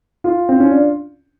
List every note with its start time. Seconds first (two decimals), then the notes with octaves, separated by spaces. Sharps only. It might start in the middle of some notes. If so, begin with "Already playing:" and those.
0.24 F4
0.49 C4
0.60 C#4
0.71 D4